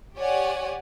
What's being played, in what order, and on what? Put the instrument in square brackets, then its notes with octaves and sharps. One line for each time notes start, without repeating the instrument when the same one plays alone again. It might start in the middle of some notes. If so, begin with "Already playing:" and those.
[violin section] G4 C#5 D5 F#5 G#5